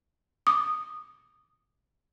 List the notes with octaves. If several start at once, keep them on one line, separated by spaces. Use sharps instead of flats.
D6 D#6